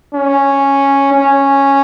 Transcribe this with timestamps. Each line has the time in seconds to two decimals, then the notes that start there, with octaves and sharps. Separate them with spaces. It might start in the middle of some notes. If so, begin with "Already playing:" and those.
0.14 C#4
1.12 C#4